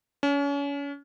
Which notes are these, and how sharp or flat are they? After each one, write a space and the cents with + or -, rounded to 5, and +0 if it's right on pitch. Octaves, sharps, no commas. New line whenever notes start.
C#4 +35